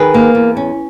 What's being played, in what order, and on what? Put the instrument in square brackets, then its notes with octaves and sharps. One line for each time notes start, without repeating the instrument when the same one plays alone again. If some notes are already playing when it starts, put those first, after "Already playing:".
Already playing: [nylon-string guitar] D#3 G#4 B4
A#3
E2
C#4